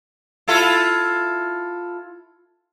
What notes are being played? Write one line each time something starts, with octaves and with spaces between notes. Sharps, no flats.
E4 F4 A4